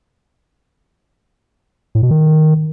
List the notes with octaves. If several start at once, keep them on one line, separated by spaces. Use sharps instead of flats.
A2
B2
D#3